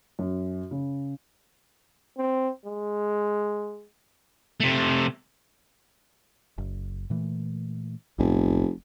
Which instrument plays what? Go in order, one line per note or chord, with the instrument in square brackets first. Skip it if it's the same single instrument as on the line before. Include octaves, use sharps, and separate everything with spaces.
[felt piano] F#2
C#3
[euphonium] C4
G#3
[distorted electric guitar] C3 A3
[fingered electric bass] F#1
A#2 E3 A3
[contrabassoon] F1 [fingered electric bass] B1 A2 B3